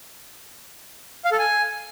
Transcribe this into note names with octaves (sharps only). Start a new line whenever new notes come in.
F5
A4
G#5